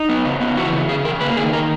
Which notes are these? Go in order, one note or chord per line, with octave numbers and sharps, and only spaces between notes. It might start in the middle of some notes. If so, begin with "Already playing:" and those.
Already playing: D#4
B3
C#3
B3
E3 F#4
C#3
C#3 G#4
C#3 A#4
A#3 B4
D#3 G#4
A#4